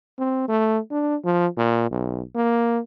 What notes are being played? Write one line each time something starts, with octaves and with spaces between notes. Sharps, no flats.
C4
A3
D4
F3
A#2
B1
A#3